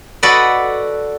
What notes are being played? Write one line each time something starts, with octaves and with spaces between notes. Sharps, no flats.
F#4 A4 B4 D5 D#5